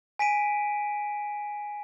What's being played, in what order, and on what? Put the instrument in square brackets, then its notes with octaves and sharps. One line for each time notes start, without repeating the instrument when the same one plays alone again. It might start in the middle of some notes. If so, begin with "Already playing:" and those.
[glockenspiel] G#5 B6 D7 D#7